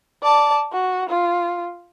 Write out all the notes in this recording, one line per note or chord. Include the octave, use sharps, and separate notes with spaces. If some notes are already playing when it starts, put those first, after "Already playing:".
D5 A5
F#4
F4